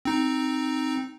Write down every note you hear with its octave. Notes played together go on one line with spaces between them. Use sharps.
C4 D#4